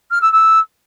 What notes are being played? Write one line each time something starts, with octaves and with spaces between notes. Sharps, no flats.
F6
E6
E6